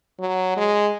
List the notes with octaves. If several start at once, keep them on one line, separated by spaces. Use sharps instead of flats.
F#3
G#3